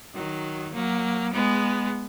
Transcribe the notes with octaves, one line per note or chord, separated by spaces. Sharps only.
D#3 F#3
F#3 A#3
G#3 B3